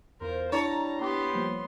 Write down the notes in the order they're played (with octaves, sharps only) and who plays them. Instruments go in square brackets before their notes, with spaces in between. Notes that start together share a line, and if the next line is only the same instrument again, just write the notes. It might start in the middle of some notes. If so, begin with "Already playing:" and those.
[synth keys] E2 [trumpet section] F4 C5 [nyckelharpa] A#4
[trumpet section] G3 A#5 [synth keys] D4 E4 [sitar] C#5 [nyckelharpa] A5
[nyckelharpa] B3 C6 [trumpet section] G4
[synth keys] F3 G3 A#3